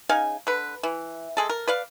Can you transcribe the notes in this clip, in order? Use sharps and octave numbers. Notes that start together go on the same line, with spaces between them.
C#3 D#4 F5 G#5
D3 B4
E3
G#3 G#4 A4
A#4
B4 D5 F5